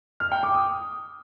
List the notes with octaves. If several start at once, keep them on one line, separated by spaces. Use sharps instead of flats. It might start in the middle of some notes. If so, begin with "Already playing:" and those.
F6
G5
D6
D#6